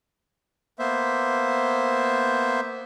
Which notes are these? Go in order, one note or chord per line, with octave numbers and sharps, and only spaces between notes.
A#3 B3 C5 E5